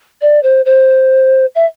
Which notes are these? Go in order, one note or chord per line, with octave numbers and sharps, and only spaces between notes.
D5
C5
C5
E5